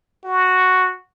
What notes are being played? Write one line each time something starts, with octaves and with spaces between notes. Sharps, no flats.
F#4